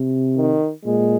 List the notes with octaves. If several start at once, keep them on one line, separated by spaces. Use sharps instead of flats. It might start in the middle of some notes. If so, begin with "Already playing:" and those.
Already playing: C3
D#3
A#2 G#3